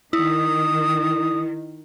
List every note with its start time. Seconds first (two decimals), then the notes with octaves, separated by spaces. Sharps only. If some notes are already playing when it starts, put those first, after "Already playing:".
0.13 D#3 E4 D#6